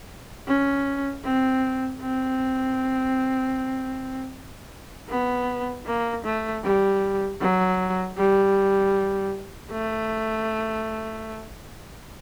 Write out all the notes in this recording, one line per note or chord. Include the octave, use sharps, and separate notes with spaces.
C#4
C4
C4
B3
A#3
A3
G3
F#3
G3
A3